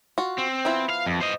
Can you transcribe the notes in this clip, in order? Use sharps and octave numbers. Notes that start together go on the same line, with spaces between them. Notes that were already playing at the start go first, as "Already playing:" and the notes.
F4 F#4
C4
F3 B3 E4
F5
F2
C5 D#5